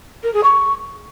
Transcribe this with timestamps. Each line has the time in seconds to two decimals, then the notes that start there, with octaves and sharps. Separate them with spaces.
0.23 A#4
0.33 G#4
0.43 C#6